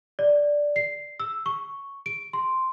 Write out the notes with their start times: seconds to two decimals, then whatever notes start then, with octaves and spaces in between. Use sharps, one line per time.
0.19 D5
0.76 C7
1.20 E6
1.46 C#6
2.06 D7
2.33 C6